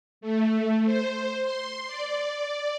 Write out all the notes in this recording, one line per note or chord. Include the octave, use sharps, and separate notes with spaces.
A3
C5
C6
D5